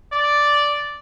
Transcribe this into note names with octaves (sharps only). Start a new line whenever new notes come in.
D5